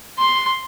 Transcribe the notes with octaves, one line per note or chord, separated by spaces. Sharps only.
C6